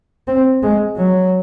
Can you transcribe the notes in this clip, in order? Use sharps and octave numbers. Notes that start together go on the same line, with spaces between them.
C4
G#3
F#3